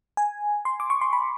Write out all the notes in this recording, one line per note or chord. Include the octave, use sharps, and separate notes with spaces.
G#5
C6
D6
C#6
C6
B5